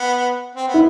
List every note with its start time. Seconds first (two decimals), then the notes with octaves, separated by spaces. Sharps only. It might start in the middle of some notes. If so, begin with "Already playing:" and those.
Already playing: B3
0.55 C4
0.68 B3
0.74 E4